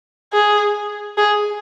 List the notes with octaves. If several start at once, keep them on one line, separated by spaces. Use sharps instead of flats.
G#4
G#4